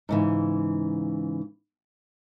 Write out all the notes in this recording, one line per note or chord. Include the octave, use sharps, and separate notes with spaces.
G#2 C#3 E3